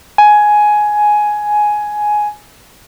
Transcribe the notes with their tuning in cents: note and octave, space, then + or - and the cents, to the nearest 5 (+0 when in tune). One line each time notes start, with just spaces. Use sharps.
G#5 +10